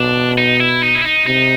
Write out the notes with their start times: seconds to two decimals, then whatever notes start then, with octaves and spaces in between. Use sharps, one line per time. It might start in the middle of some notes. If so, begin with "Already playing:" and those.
Already playing: B2 D4
0.38 D#4
0.60 E4
0.82 D#4
0.95 E4
1.04 D#4
1.26 C3 D#4